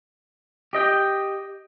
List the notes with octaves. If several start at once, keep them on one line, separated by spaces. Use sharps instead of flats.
G4 D#5 G5